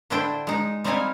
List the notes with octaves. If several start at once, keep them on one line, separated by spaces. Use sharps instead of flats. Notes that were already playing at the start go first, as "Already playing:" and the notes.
A2 D3 D4 E4 C5 G5
G#3 D#4
G3 C4 D#4 E4 F5 G#5